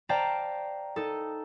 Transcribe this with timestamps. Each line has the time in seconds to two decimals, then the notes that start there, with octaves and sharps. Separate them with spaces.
0.09 C5 D5 F5 G5 A5 A#5
0.96 D#4 A4